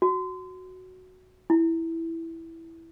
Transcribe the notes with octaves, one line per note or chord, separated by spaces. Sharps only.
F#4
E4